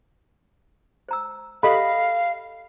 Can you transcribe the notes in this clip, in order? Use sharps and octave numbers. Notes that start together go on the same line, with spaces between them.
C5 A#5 E6
G4 A4 D#5 F5 B5